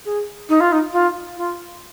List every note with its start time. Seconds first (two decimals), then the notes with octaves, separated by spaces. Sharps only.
0.05 G#4
0.49 D#4
0.60 F4
0.72 D#4
0.93 F4
1.37 F4